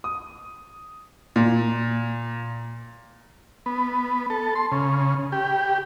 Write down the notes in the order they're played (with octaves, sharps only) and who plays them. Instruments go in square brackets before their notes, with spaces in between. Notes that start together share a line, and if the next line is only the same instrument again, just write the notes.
[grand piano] D#6
A#2
[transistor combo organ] B3
A4
C6
C#3
G4